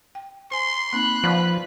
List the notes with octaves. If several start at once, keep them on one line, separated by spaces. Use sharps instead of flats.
G5
C5 G#5 C6
A#3 C4 D#4 B5 F#6
F3 B4 D5 F#5 C#6